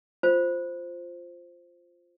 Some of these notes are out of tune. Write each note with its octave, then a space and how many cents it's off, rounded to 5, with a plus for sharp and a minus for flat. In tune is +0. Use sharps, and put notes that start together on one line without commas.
F4 +0 C5 +0